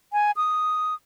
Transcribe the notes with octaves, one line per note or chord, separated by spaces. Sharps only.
G#5
D#6